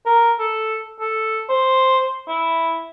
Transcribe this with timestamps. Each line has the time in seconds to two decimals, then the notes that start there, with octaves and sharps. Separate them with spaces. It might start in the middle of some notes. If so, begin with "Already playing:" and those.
0.06 A#4
0.39 A4
1.00 A4
1.49 C5
2.28 E4